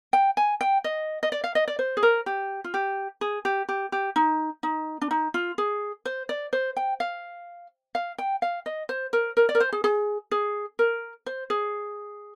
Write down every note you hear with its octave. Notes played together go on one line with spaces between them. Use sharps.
G5
G#5
G5
D#5
D#5
D5
F5
D#5
D5
C5
G#4
A#4
G4
F4
G4
G#4
G4
G4
G4
D#4
D#4
D4
D#4
F4
G#4
C5
D5
C5
G5
F5
F5
G5
F5
D#5
C5
A#4
A#4
D5
A#4
C5
G#4
G#4
G#4
A#4
C5
G#4